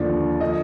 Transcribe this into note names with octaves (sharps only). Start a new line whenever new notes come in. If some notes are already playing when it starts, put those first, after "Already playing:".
Already playing: D#2 D3 F3 D5
D3 F3 D#5